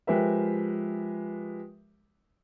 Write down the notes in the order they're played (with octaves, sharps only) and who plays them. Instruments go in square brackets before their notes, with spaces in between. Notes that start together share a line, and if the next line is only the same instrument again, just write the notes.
[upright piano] F3 G#3 G4 A#4 B4 E5